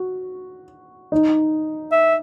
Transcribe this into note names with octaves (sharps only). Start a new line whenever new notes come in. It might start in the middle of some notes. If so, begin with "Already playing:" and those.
Already playing: F#4
D#4
E5